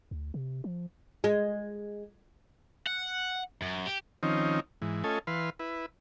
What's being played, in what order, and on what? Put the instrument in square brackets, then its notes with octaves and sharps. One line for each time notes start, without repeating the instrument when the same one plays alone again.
[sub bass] D2
C3
F3
[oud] G#3
[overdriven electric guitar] F#5
F#2
G4
[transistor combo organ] D#3 F3 C4 C#4 D#4
G#2 E3
A3 C#4 F4 A4 D#5 G#5
E3 B4 F5 C6
E4 B4